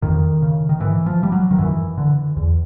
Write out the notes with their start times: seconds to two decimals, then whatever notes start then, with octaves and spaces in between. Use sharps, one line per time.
0.02 F2 D#3
0.42 C#3
0.69 D#3
0.80 G#2 E3
1.06 F3
1.23 G3
1.32 F#3
1.51 D#3
1.58 F#2 E3
1.98 D3
2.37 E2